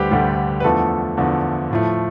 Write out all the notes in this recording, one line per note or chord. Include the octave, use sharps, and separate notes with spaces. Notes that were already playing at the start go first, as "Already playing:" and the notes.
Already playing: D2 D3 G3 G4 B4 C5
D2 D3 G3
B4
E2 D3 F3 A3 A4
E2 D3 F3 A3
A2 F3 A3